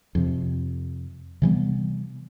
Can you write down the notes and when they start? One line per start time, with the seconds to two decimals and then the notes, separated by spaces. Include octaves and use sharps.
0.15 F2 C3
1.42 C3 E3 G3 B3